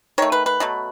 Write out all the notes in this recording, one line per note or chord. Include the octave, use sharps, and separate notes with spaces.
D#3 A3 C#5
B4
B4
B2 F#3 A3